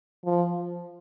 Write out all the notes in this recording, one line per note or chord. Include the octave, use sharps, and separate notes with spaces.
F3